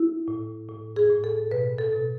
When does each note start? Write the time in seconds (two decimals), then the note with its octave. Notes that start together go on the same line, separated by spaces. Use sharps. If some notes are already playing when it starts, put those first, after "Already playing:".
Already playing: E4
0.28 A2
0.69 A2
0.96 G#4
1.10 A2
1.24 A4
1.51 B2 B4
1.78 A4
1.92 B2